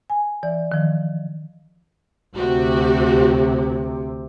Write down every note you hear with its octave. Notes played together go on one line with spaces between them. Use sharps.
G#5
E3 D5
D#3 F3
D2 C3 F#4 G4